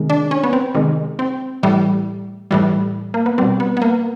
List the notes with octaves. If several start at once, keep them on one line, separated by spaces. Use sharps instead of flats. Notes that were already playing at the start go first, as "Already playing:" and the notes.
Already playing: C3 D#3 G#3
D4
C#4
B3
C4
C3 D#3 G#3
C4
A2 E3 G3
A2 E3 G3
A#3
B3
B2 G3 C4
B3
B3
A#3